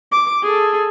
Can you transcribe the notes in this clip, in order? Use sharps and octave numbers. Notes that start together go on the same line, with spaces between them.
D6
G#4 A4